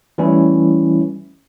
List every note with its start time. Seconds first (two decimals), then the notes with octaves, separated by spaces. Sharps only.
0.18 E3 G3 A3 C#4 E4